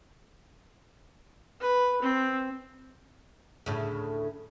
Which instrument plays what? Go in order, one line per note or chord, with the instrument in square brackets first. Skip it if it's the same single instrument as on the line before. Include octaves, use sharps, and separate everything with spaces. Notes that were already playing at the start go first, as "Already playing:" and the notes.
[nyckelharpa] B4
C4
[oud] D2 A2 C#3